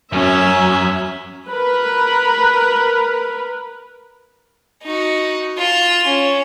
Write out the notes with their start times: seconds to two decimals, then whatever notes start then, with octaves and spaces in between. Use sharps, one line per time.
0.13 F#2 C#4 E5
1.49 A#4 B4
4.84 D#4 F#4
5.58 F4 E7
6.07 C#4